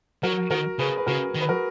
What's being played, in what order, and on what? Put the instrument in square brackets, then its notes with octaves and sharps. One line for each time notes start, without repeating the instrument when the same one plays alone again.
[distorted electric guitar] F#3 [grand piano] F#4 A#4
[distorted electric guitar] D#3 [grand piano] F#4 A#4
[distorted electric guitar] C#3 [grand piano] G#4 B4
[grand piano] B4
[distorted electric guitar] C#3 [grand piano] F#4 A#4
[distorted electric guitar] D#3
[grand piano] B4
F#4 A#4